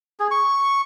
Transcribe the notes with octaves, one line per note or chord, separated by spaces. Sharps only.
G#4
C#6